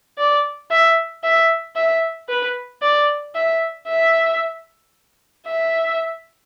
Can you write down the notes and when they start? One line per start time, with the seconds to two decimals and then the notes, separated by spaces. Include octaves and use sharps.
0.18 D5
0.71 E5
1.23 E5
1.76 E5
2.29 B4
2.82 D5
3.35 E5
3.88 E5
5.46 E5